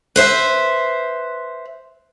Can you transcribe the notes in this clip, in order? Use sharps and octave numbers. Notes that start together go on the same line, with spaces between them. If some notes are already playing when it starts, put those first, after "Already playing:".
B4 C5 E5